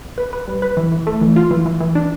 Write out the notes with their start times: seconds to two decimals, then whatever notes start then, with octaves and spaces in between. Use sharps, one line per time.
0.18 B4
0.33 B4
0.47 G3
0.62 B4
0.77 E3
0.92 E3
1.07 A3
1.21 E3
1.36 F4
1.51 E3
1.66 E3
1.80 E3
1.95 D4